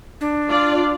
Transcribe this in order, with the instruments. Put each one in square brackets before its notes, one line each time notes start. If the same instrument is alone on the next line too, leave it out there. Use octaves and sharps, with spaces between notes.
[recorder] D4
[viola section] F4 D5